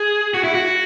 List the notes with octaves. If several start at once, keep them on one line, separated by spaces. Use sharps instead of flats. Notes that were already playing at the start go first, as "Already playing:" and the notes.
Already playing: G#4
F#4
E4
F#4